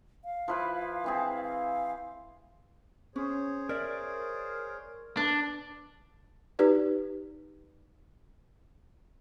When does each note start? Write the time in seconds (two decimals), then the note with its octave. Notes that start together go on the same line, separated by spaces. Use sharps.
0.24 F5
0.48 F3 E4 B4
1.04 E3 C4 G#4
1.44 F5
3.16 C#4 G#4 C5 C#5
3.69 A#4 D5 E5
5.17 D4 B4
6.59 D#4 G4 B4 D5